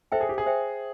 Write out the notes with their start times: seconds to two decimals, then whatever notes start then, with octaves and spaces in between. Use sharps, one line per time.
0.12 A4 C5 E5 G5
0.21 G#4
0.29 G4
0.38 G#4
0.46 C5 E5 G5